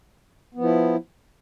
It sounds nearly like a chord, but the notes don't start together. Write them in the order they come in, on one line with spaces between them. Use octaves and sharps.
B3 F3 E4